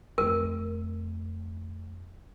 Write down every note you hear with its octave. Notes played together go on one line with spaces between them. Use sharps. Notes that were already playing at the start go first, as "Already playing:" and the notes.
F2 A3 A#4